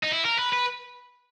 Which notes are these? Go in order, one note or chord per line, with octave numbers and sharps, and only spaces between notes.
D#4
E4
A#4
B4
B4